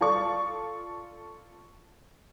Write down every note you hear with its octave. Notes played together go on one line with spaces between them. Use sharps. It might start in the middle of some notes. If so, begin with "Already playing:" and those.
F4 A4 D5 C#6